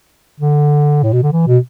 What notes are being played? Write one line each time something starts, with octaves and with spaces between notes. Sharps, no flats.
D3
A2
B2
D3
E3
B2